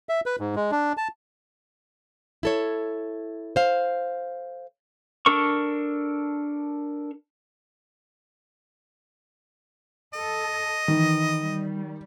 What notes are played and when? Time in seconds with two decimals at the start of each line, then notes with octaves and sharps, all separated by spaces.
0.09 E5
0.26 B4
0.39 G#2
0.56 G#3
0.71 D4
0.97 A5
2.43 E4 A4 C#5
3.56 C5 F5
5.26 D4 A4 A#4 C#6
10.14 A4 D#5
10.88 D#3 E3
11.40 G3